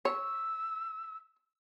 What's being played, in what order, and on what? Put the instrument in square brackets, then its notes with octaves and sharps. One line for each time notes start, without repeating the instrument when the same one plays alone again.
[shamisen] C#5 [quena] E6